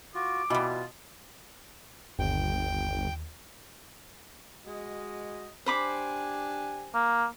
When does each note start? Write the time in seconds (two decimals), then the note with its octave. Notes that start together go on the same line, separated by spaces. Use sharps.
0.15 F4 F#4 D6
0.50 B2 E3 G3 F4
2.19 G1 D#2 G5
4.66 G#3 F#4 D#5
5.66 D4 G4 C5 G#5 B5 D6
6.94 A#3